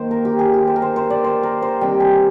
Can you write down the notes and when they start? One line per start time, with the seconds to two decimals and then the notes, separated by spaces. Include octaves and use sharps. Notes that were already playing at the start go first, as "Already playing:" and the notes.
Already playing: D#3 A#3 C5 G5
0.11 A#4
0.25 G4
0.39 G#4
0.54 G4
0.67 C5
0.76 A#4
0.82 C5
0.96 C5
1.10 D5
1.24 C5
1.43 A#4
1.62 C5
1.81 C3 D#3 G3 G5
2.00 G#5